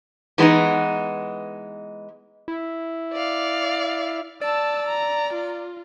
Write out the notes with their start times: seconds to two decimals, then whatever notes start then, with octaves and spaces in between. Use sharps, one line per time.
0.38 E3 G#3 B3 D4 D#4
2.48 E4
3.13 D5 F5
4.42 D5 A5 E6
4.87 A#5
5.34 F4